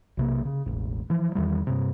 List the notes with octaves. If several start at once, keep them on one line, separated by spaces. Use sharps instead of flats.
B1 C3 A#3
C#3
E1 A1 F2
E3 F3
E2 D#3 E3 G3
G2 C3